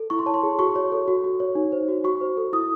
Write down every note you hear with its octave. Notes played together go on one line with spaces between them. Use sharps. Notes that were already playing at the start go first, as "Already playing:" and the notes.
Already playing: A4
E4 C#6
C6
C#5 A5
C6
G#4
F#4 C#6
C#5
A4
F#4
F#4
C#5
D#4
C5
F#4
F#4 C#6
C5
A4
E4 D#6